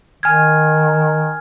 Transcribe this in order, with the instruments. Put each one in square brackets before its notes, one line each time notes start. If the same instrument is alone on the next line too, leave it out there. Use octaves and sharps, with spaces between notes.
[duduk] D#3 [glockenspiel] G#5 F6 G#6